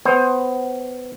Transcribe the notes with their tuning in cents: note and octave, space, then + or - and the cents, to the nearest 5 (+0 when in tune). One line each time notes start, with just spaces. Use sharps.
B3 +25 C5 +20